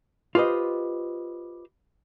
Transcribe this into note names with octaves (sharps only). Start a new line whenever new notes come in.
F4 G4 B4 C5 D#5